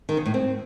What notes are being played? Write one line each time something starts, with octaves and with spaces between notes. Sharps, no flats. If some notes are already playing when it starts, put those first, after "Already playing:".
D#3
C#3
A2
C4